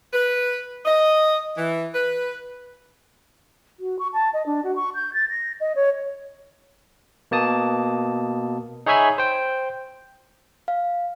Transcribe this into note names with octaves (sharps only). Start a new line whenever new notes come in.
B4
D#5
E3
B4
F#4
C#6
A5
D#5
D4
F#4
C#6
G6
A6
A#6
D#5
C#5
B2 A#3 A5 D#6
D#4 G#4 C#5 E5 G#5 B5
C5 G5
F5